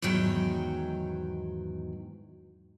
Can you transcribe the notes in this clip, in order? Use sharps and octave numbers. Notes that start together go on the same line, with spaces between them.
E2 G#2 D#3 F#3 G5